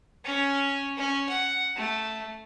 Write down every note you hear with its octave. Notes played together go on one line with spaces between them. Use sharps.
C#4
C#4
F#5
A3